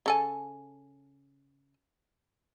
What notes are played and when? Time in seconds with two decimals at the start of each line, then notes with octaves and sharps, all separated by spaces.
0.06 C#3 A4 G#5